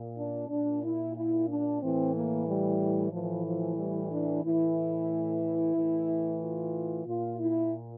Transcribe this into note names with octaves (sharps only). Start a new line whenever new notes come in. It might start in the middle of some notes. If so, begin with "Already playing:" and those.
Already playing: A#2
D4
A#2 D4
E4
E4
D4
A2 E3 C4
A#3
G3
A2 E3 F3
F3
G3
D4
A2 E3 E4
A2 E3
F4
A#2 F4
E4